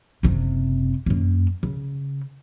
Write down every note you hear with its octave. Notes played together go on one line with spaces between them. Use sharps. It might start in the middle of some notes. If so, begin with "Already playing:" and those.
F#1 C3
F#2 A#3
C#3